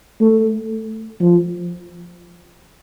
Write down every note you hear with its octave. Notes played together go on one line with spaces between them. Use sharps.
A3
F3